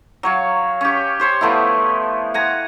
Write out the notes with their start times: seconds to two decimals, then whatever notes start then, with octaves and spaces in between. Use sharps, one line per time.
0.23 F#3 C#5 F5
0.81 C#4 G4
1.20 G4 C5 C#5
1.41 F3 A3 B3 E4
2.34 F#5 G#5 A#5